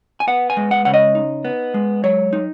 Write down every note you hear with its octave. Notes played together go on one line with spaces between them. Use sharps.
G#5
B3 F#5
G#5
G#3
F#5
C#3 F#5
D#5
D#4
B3
G#3
F#3 C#5
D#4